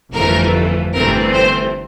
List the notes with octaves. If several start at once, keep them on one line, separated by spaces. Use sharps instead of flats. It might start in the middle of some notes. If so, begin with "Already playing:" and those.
G1 F2 E3 A3 A#4
G1 G2 E3 A3 C4 A#4
C5